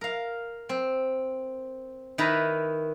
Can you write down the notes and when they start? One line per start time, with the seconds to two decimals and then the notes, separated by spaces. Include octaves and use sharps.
0.01 A#4 F5
0.69 C4
2.18 D#3 E4 B4 A#5 B5